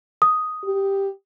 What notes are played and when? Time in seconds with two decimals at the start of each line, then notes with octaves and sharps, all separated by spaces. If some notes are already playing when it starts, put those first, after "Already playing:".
0.22 D#6
0.65 G4